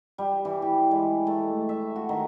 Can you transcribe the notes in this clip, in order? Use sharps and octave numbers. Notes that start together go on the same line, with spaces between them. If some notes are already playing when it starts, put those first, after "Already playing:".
G3
E3
G4
G#3
A3
E5
F#4
D#3